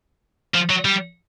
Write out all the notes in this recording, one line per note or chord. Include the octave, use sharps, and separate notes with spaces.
F3
F#3
G3